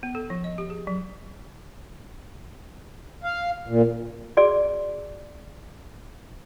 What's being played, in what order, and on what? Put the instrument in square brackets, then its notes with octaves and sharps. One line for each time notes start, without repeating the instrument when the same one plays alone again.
[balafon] B3
A4
F3
D#5
G4
G#4
F#3
[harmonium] F5
A#2
[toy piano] F#4 G#4 D5